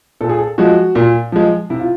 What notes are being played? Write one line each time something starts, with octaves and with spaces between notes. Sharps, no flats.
A#2 A4
G#4
A4
F3 G#3 F#4
A#2
F3 G#3
C3 E4
F4